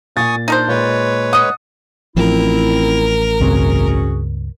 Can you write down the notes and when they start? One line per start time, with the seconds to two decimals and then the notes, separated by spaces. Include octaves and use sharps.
0.17 A#2 G#5 C#6 D#6 A6
0.48 D4 D#4 A#4 C5
0.68 A#2 G#3 B4 C#5
1.33 D#5 F#5 D#6
2.16 A1 F3 C4 E4 A#4
3.41 C#2 G2 C4 C#4 F#4 G#4